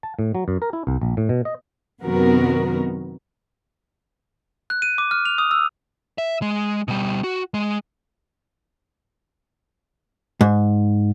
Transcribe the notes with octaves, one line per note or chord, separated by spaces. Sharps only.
A5
A2
F#3
F#2
A#4
E4
C2
A#1
A2
B2
D#5
F#2 C3 D#3 B3 F#4 A#4
F#6
D#7
D6
F6
F7
D#6
E6
E5
G#3
B2 G3
F#4
G#3
G#2